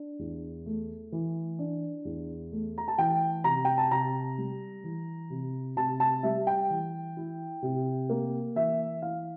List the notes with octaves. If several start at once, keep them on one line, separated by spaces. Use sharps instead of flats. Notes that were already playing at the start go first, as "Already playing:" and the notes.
Already playing: D4
E2
A3
E3
D4
E2
A3
A#5
A5
E3 G5
C3 A#5
G5
A5
C3 A#5
G3
E3
C3
C3 A5
A5
G3 E5
G5
E3
E4
C3
A#3
E3 E5
E4 F5